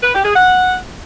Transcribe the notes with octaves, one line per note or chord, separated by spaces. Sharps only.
B4
G4
G#4
F#5